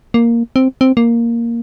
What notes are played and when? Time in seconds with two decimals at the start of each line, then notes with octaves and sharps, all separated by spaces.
0.14 A#3
0.56 C4
0.81 C4
0.97 A#3